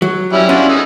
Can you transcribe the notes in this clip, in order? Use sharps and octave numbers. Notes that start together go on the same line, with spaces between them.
F#3
G3 C#4 E4
C#4 D4 F4 F#4
D#4 G#4 A4